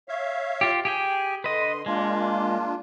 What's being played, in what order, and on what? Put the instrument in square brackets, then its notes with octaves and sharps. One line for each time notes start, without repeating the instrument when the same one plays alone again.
[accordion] C#5 E5 F5
[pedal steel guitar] F4 G4
[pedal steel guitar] G4 G#4 G5 [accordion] G#5
[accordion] D3 C6 [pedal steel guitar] B4 D#5
[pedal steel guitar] G#3 [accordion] A#3 D4 F4